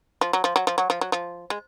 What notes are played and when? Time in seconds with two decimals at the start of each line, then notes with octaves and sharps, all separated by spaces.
0.21 F3
0.33 F#3
0.44 F3
0.56 F#3
0.67 F3
0.78 F#3
0.90 F3
1.01 F#3
1.12 F3
1.50 G#3